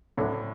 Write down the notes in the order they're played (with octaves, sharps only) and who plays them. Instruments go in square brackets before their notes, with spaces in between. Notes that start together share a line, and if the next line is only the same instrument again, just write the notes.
[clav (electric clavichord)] D2 D3 F#3 [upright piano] A2